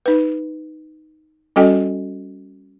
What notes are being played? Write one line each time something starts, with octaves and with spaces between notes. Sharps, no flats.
D#4 B4
G3 C#4 F#4 A4 D#5 G5